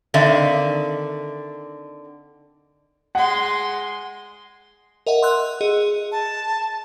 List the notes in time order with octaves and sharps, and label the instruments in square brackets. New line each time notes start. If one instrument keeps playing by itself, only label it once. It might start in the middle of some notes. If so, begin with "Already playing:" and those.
[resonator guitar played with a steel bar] D3 D#3 C4 D5 E5 F5
[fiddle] G#3 C6 [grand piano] F#5
[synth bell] A#4 D#5 E5 F#5
C6 E6 F#6
G#4 D#5
[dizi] A5